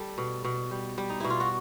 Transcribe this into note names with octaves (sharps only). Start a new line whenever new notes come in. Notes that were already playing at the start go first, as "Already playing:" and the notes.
Already playing: G3 A4
B2
B2
G3
G3
D#4
B2 E4
F4
F#4